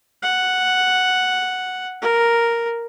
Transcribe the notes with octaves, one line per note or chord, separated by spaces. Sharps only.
F#5
A#4